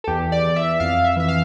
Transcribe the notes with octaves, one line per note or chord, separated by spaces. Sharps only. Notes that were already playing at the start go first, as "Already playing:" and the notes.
A4
E2 G4
D5
E2
E5
F2 F5
E5
E3 E5
F5